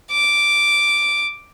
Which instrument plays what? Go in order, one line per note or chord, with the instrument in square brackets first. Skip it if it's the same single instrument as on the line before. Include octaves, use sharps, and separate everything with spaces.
[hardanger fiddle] D6